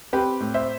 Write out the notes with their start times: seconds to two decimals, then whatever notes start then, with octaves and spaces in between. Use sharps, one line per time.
0.13 C4 G4 B4
0.40 A2
0.54 C5 E5